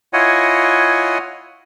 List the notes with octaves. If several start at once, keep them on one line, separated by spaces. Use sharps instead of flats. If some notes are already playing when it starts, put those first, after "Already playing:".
E4 F4 C#5 D#5 F#5 G#5